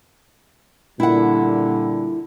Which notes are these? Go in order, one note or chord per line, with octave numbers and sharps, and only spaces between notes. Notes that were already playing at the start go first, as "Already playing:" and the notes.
A#2 D3 G3 E4 F#5